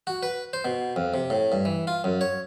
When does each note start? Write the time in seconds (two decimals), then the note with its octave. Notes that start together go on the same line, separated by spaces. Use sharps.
0.07 F#4
0.23 B4
0.53 C5
0.65 B2
0.96 F2
1.14 C3
1.30 A2
1.52 G2
1.65 E3
1.87 F4
2.04 F#2
2.21 C#5